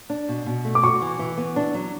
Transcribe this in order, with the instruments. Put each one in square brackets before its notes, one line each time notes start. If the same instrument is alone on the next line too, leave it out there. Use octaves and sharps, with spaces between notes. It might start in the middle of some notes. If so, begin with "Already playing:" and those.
[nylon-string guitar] D4
B2
B2
A3
[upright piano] D6
[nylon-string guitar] F#4 [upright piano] C#6
[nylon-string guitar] E3
E3
B3
D4
F#3